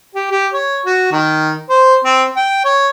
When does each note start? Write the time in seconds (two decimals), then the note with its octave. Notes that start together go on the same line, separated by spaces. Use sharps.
0.15 G4
0.31 G4
0.53 C#5
0.85 F#4
1.12 D#3
1.69 C5
2.04 C4
2.36 G5
2.65 C#5